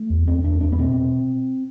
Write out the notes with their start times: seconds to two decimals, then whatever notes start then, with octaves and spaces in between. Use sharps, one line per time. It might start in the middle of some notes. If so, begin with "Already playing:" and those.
Already playing: A3
0.10 E2
0.27 E2 C4
0.44 E2 D4
0.61 E2 D4
0.72 B3
0.79 B2 C4
0.96 B2